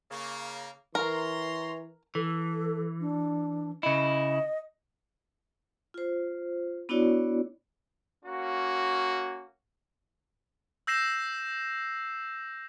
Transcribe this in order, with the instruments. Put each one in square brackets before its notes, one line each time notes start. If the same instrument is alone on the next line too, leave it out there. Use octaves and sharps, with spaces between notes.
[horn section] C#3 A#3
[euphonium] E3 [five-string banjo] A#4 [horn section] C#5 A#5 C6
[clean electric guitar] E3 [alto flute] A4
[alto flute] D4
[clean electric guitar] C#3 E4 [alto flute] D#5
[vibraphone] F4 C5
B3 D4 E4 F#4 C#5 D5
[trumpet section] A#3 C#4 F#4
[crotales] E6 G6 A#6 C7 E7